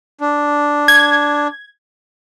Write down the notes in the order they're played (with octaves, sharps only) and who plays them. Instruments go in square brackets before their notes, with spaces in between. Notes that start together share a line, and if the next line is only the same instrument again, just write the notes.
[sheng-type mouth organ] D4
[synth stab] G#6